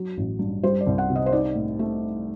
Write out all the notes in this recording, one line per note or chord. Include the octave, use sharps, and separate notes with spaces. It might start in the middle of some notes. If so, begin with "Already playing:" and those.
Already playing: F#3
A1
G2
G3 C5
D5
C2
F#5
C3
D#5
C5
D#4 D5
A2
A3